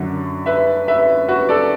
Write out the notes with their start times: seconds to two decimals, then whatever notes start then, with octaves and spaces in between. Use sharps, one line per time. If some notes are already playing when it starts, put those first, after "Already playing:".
Already playing: F#2 D3 F#3
0.46 B4 E5
0.88 B4 E5
1.29 F#4 B4
1.49 A4 D5